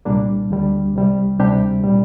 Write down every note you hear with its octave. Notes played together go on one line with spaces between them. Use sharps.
C2 A#2 G3 A#3 D4
D2 D3 G3
C2 C3 G3
D2 C3 G3 D4 G4
A#2 G3